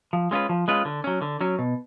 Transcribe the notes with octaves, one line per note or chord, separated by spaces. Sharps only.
F3
G#3 C#4 F4 B4
F3
G#3 C#4 F4 B4
D3
F#3 C#4
D3
F#3 C#4
B2